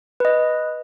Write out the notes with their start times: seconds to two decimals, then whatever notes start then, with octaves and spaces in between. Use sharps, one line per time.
0.20 B4 D#5